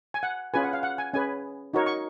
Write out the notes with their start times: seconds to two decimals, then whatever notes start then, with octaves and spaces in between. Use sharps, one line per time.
0.14 G#5
0.23 F#5
0.54 C#4 F4 G#4 B4 G#5
0.64 F#5
0.73 F5
0.83 F#5
0.98 G#5
1.14 C#4 G#4 B4 G#5
1.74 D#4 F#4 A#4 C#5
1.86 C#6